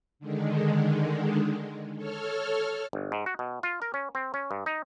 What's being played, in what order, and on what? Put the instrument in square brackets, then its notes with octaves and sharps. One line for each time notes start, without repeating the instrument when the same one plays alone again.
[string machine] D3 D#3 G#3
A4 C#5 F6
[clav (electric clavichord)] G1
G#2
F#4
B2
F4
A#4
C#4
C4
C#4
G2
D#4